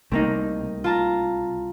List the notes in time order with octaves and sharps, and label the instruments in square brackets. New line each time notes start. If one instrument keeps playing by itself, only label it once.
[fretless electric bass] C2 [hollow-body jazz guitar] A3 A#3 D#4 [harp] C4
[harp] F4 A5 A#5